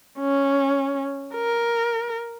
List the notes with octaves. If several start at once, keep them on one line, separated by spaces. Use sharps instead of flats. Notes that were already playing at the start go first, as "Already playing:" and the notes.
C#4
A#4